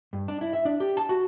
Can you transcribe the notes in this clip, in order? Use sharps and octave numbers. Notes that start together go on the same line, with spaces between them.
G2
D4
E4
E5
D4
G4
A5
F#4